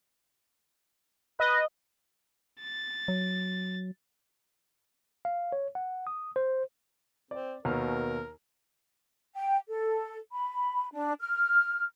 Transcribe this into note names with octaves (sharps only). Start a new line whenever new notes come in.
B4 D#5
A6
F#3
F5
C#5
F#5
D#6
C5
C4 D5
D#2 B2 A#4 F6
G5
A4
B5
D4
F6